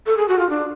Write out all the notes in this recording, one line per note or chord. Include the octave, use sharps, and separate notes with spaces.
A4
G#4
F#4
F4
D4